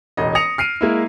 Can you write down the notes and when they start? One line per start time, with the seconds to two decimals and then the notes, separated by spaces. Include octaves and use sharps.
0.17 E1 A1 D#5
0.35 D#6 A#6 C#7 F7
0.58 F6 C7 D7 D#7
0.81 G#3 A#3 E4